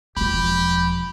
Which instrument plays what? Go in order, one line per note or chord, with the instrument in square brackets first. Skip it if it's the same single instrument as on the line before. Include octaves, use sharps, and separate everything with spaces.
[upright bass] E1 F3 [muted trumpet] G4 [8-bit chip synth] B5